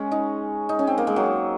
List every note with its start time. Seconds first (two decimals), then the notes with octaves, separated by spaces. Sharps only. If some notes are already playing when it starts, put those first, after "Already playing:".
Already playing: G#3 C#4
0.12 D#4
0.69 D#4
0.79 C#4
0.87 C4
0.98 A#3
1.07 G#3
1.16 F#3